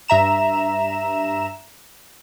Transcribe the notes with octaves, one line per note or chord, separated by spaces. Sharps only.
G2 E5 A#5 E7